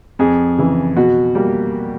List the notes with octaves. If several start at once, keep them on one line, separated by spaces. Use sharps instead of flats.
F2 G#4
C#3 E3
B2 F#4
G3 A#3